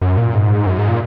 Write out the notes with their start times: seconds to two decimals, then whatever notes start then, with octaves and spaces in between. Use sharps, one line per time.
0.01 F#2
0.17 A#2
0.34 G#2
0.66 F#2
0.78 G#2
0.88 A#2